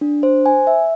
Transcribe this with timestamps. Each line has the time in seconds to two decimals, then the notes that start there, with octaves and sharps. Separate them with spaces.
0.01 D4
0.23 C5
0.46 G#5
0.67 E5